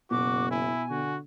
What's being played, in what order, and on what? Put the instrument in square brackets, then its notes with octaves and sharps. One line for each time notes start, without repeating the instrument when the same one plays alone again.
[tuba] F#1 [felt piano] B2 [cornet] F#4 [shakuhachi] D6
[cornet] E4 [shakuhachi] G#5
[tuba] D3 [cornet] F#4